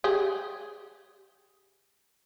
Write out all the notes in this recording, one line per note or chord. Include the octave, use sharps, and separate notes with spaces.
G4 G#4